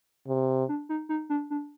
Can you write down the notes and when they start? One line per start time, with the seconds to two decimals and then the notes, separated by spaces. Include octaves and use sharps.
0.27 C3
0.68 D4
0.89 D#4
1.09 D#4
1.30 D4
1.50 D4